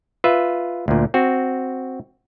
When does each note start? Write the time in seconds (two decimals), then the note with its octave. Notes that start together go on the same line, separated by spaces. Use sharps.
0.24 F4 B4 E5
0.88 D2 A#2
1.14 C4 F#4